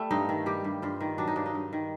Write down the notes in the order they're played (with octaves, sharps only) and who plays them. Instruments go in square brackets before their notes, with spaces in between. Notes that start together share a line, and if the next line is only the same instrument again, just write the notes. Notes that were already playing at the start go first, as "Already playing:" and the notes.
Already playing: [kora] G3 A3
G2 D#4
D#3
G3 G4
G2
G2 F4
D#3
F#3 D4
D#4
G2 D4
D#4
G2
D#3